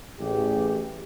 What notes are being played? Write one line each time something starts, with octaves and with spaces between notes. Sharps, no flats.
A1 G4 G#4